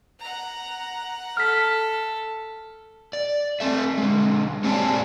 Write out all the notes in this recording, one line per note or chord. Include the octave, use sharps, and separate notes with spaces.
F#5 A#5
A4 F6 B6
D5
A3 C4 A4 E5
D3 G#3
A#3 C4 G#4 C#5 D5 A5